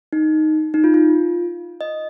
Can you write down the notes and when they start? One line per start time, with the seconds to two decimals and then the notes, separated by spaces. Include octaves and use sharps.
0.13 D#4
0.74 D#4
0.84 F4
0.94 F4
1.81 D#5